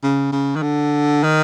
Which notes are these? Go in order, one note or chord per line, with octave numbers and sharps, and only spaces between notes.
C#3
C#3
D#3
D3
D#3